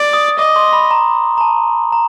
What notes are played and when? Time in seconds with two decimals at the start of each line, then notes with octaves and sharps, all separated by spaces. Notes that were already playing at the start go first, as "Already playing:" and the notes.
Already playing: D5
0.13 D#6
0.39 D#5 D6
0.56 C6
0.73 B5
0.91 A#5
1.38 A#5
1.41 A5
1.92 A#5